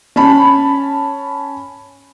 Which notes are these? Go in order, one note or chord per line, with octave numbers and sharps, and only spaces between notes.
C#4 A5 B5